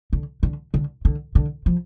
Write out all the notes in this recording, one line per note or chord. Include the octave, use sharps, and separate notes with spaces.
D3
D3
D3
D3
D3
F3